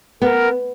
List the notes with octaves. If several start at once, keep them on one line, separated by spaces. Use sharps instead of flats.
B3 A#4